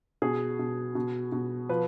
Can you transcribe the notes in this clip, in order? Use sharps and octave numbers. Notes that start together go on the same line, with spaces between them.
B2 G#4
B2
B2
B2
F3 B4